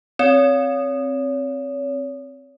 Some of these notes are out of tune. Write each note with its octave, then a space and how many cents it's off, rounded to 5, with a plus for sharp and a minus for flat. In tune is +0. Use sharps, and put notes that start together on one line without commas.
C4 +10 C#5 +35